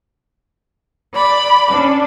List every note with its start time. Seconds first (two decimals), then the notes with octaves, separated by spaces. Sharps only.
1.16 D5 B5
1.70 C#4 D4